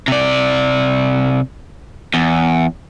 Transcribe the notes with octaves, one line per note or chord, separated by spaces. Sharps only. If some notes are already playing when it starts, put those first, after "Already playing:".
C3 D5
E2